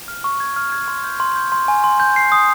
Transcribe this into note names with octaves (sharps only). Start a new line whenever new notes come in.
F6
C#6
G#6
F6
G#6
C6
G6
C6
G6
C6
G#5
C6
G6
C7
D#6